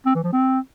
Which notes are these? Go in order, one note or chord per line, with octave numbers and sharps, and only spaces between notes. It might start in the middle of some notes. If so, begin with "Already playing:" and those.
C4
E3
F3
C4